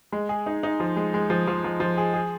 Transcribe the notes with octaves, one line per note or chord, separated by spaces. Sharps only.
G#3
G#4
D#4
D#4
F3
G#3
G#3
F3
F3
F3
F3
G#4
G#4